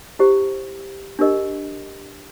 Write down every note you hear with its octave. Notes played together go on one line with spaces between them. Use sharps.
E4 G4 C5
D4 G4 A#4 D#5